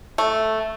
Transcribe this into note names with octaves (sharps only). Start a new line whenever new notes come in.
A3